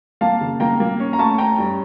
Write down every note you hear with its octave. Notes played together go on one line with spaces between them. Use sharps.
A#3 F5 A5
C#3
A#3 G5 A#5
A#3
C#4
A#5
A3 A5 C#6
C#4 G5 A#5
G2